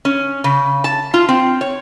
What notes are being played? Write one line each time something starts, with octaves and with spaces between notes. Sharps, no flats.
C#4
C#3
A5
F4
C4
C#5